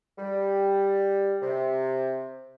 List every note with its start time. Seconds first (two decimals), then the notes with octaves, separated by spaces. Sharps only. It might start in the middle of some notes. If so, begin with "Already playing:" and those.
0.18 G3
1.42 C3